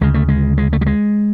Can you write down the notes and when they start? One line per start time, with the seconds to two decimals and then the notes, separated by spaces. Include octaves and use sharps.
0.01 D2 C#3 G#3
0.14 A3
0.29 G#3
0.58 G#3
0.73 A3
0.81 G3
0.86 G#3